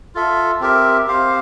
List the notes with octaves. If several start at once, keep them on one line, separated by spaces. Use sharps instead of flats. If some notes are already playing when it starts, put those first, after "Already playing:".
F4 A4 E5
C4 G4 A#4 E5
C4 G4 C5 F5